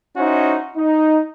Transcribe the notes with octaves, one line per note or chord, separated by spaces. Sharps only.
C#4 D#4 E4 F#4 C5
D#4